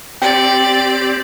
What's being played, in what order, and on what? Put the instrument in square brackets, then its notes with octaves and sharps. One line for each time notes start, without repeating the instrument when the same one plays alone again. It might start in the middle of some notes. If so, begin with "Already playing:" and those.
[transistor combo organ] C4 G4 [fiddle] D5 [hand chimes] G5